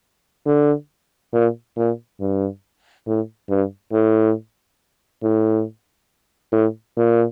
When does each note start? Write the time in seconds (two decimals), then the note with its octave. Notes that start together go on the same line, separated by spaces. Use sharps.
0.46 D3
1.33 A#2
1.77 A#2
2.20 G2
3.07 A2
3.49 G2
3.92 A2
5.23 A2
6.53 A2
6.97 A#2